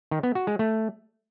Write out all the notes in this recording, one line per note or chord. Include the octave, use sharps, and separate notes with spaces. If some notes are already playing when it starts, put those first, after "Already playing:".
D#3
B3
F#4
G#3
A3